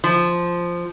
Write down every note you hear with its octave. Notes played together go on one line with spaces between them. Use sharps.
F3